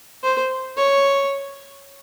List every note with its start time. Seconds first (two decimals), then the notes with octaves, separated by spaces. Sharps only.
0.23 C5
0.77 C#5